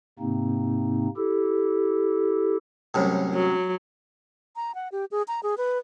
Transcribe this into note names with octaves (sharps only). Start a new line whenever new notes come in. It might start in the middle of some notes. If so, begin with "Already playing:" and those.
G#2 C3 A#3 C4 D#4
E4 G4 A4
C2 F#2 A2
F#3
A#5
F#5
G4
G#4
A#5
G#4
B4